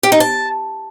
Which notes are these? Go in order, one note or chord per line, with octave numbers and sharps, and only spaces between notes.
G4
D#4
A5